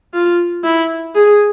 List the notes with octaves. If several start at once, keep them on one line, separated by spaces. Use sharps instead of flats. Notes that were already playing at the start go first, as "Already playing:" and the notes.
F4
E4
G#4